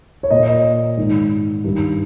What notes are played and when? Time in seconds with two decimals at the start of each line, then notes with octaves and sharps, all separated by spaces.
0.23 C#5
0.31 A#2 D#5
0.97 G#2 D#3
1.64 G2 D#3